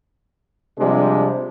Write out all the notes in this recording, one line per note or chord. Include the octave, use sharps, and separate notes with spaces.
C3 F3 G3 G#3 D4 G4